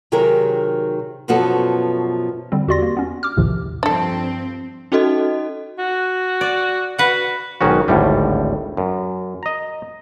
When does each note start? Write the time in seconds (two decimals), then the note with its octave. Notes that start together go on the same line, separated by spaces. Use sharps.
0.12 C3 D#3 F#3 G4 G#4 A#4
1.28 F#2 B2 F3 B3 F#4 A4
2.52 D3 G3 C4
2.68 E2 F#4 G4 D5 C6 A#6
2.82 A#3
2.97 B3 C#4
3.23 D6 F6
3.37 A#1 D#2 A2 C3 D#3 F3
3.83 G2 F3 C4 D4 A4
4.92 C#4 D#4 F#4 A4 D#5
5.79 F#4
6.41 D5
6.98 F#4 B4 F#5
7.61 B1 G#2 D#3 C#4 F#4
7.88 G#1 D2 A2 G3
8.77 F#2
9.43 D#5 A#5